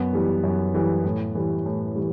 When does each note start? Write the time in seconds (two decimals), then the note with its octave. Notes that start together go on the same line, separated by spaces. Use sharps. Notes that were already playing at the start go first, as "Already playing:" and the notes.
Already playing: F#2 B3
0.13 E3 G3
0.44 F#2
0.74 E3 G3
1.04 A2
1.35 E3 G3
1.66 A2
1.95 E3 G3